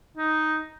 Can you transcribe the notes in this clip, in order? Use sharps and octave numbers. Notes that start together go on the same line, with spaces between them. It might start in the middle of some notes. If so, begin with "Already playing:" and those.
D#4